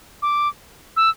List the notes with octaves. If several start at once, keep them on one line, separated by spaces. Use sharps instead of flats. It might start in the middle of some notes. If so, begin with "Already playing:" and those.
D6
E6